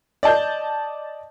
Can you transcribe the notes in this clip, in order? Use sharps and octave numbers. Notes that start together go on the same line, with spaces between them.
D5 D#5 A5 G6